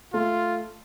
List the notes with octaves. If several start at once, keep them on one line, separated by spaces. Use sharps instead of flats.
A3 F4